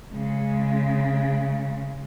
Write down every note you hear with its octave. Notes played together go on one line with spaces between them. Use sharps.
C#3 G#3